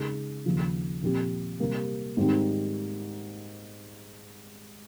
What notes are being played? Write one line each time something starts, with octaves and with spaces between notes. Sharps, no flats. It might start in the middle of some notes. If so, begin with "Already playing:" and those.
Already playing: C#3 G#3 D#4 G#4
D#2 C#3 F3
A#2 F3 C4 G4
C3 G3 A#3
G#2 D#3 G3 C4